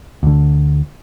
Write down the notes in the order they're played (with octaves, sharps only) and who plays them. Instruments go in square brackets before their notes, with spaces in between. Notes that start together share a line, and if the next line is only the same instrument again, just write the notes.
[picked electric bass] D2 D3